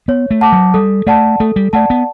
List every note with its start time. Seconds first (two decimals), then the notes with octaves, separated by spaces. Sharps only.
0.08 B3 C#5
0.31 A3
0.41 F#5 A5 D6
0.52 F#3
0.74 G3 A4
1.07 A3 D5 F#5 A5
1.40 A3 A4
1.56 G3
1.73 A3 D5 F#5 A5
1.90 B3